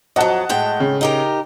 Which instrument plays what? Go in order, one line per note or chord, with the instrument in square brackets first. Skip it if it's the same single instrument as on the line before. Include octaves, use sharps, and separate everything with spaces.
[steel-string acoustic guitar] F2 F#3 [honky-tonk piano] D#5 F#5 A5
[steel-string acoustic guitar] A2 G#3 G5
[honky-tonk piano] C#3
[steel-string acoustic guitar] D#4 G4 A#4